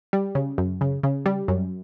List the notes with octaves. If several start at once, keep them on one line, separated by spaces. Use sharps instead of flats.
G3
C#3
F#2
C#3
C#3
G3
F#2